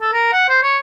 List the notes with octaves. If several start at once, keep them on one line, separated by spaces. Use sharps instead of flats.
A4
A#4
F#5
C5
C#5